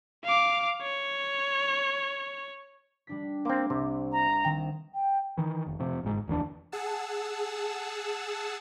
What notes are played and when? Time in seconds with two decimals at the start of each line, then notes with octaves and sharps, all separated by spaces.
0.25 F5 D6
0.82 C#5
3.07 G3 D4 B6
3.45 A#3 C4 C6 D6
3.70 C2 C3
4.12 A#5
4.45 D#3 C4 G5 E7
4.95 G5
5.38 D#3 E3
5.67 F1
5.79 F1 F2 C3
6.03 G1 G#2
6.28 F1 D#2 E3 D4
6.72 G#4 F#5 A5 E6